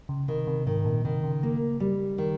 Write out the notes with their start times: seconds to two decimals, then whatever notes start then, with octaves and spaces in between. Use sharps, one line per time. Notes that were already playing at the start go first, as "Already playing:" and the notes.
0.09 C#3
0.28 C3 D#3
0.47 C3
0.66 G#2 D#3
0.85 A#2
1.05 C3 D#3
1.23 C#3
1.43 A#3
1.80 G3
2.18 D#3